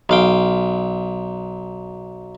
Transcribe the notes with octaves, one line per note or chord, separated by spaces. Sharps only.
B1 F5 G5